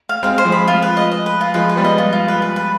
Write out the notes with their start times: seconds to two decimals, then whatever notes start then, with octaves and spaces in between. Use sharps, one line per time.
0.09 F5
0.23 G#3 C4 F5
0.38 C5
0.45 F3 G#3
0.52 B5
0.68 F4
0.82 B4
0.97 D#5
1.11 D#5
1.26 B4
1.41 F4
1.54 F3 G#3 B4
1.69 B4
1.76 G3 B3
1.84 D#5
1.98 F4
2.12 F4
2.28 B4
2.42 B4
2.56 B4